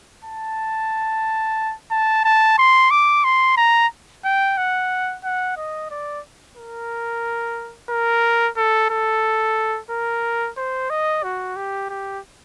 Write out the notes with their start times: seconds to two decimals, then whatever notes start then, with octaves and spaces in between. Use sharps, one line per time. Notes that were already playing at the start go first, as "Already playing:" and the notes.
0.24 A5
1.91 A5
2.25 A5
2.58 C6
2.91 D6
3.24 C6
3.57 A#5
4.24 G5
4.58 F#5
5.24 F#5
5.57 D#5
5.91 D5
6.57 A#4
7.90 A#4
8.57 A4
8.90 A4
9.90 A#4
10.57 C5
10.90 D#5
11.23 F#4
11.57 G4
11.90 G4